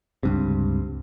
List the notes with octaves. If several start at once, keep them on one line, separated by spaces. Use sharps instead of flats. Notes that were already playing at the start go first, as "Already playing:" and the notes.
C#2 G2 C3